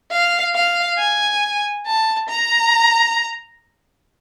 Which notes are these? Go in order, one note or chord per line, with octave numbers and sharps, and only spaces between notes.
F5
F5
G#5
A5
A#5